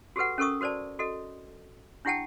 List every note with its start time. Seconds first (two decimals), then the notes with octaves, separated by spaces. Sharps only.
0.16 F#4 G4 A4 B4 F#5
0.38 C#4 A4 A#4 C#6 D#6
0.61 F#4 A#4 C5 D5 A5
0.99 F#4 A4 D#5
2.05 D4 E4 G4 F#5 G5 A5